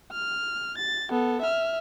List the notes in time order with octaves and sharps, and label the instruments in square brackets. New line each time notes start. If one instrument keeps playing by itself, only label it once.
[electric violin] F6
A6
B3 A4
E5 F6